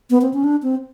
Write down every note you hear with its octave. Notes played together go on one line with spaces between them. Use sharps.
B3
C4
C#4
D4
C4